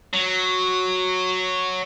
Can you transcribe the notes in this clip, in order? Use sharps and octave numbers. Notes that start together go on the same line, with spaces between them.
F#3